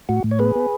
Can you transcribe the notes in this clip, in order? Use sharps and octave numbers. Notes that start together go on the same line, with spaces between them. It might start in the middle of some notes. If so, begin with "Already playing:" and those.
A2 F#4
A2
C#5
B3 G#4 B4
B3